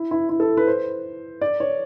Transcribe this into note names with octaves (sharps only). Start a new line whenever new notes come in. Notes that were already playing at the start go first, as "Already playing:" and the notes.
Already playing: E4
E4
E4
A4
B4
C5
D5
C#5